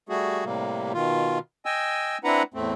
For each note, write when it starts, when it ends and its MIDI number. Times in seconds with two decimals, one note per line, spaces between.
0.09 0.44 55
0.09 0.44 57
0.09 0.44 66
0.09 0.44 68
0.45 0.92 45
0.45 0.92 48
0.45 0.92 55
0.45 0.92 58
0.93 1.39 47
0.93 1.39 51
0.93 1.39 65
1.66 2.18 75
1.66 2.18 79
1.66 2.18 80
1.66 2.18 88
2.24 2.43 60
2.24 2.43 62
2.24 2.43 64
2.24 2.43 71
2.24 2.43 78
2.24 2.43 82
2.54 2.74 40
2.54 2.74 45
2.54 2.74 57
2.54 2.74 60